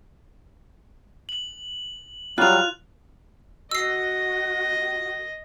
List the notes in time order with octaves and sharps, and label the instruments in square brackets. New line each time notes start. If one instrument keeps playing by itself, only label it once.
[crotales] F#7
[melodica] F#3 G3 [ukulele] F4 [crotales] F#6 F7
[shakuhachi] F#4 [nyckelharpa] D#5 [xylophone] E6 C7